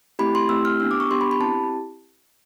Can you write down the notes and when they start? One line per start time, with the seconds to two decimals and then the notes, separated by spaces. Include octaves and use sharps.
0.19 A3 C4 E4 G4 B5
0.35 C6
0.49 A3 C4 E4 G4 E6
0.65 F6
0.80 B3 D4 G4 E6
0.91 D6
1.00 C#6
1.11 B3 D4 G4 C6
1.21 B5
1.31 B5
1.40 C4 E4 G4 A5